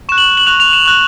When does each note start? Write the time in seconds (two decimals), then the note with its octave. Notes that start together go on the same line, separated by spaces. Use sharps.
0.09 C#6 E7
0.12 F#6
0.18 F#7
0.37 F#7
0.47 C#6 F#6 F7
0.60 F7
0.73 E7
0.85 C#6 F#6